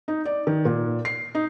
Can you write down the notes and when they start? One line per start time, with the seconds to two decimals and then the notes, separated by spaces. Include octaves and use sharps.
0.08 D#4
0.25 D5
0.47 D#3
0.65 A#2
1.05 C7
1.35 D#4